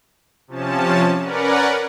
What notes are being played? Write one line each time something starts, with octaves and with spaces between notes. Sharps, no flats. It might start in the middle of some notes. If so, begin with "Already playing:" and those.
C3 F3 C#4 A5
C#4 A#4 B4 D5 F#5